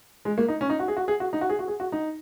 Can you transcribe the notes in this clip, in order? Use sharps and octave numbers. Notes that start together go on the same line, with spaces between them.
G#3
A#3
D#4
C#4
D#4
F#4
G#4
F#4
G#4
F#4
D#4
F#4
G#4
F#4
G#4
F#4
D#4